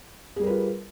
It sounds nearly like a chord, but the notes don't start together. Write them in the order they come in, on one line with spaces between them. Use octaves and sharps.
G#4 G3 A#4 B4 F4